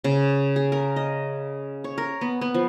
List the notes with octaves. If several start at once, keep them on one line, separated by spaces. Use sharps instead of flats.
C#3
G#4
A#4
D#5
C#5
A#4
B3
B3
F3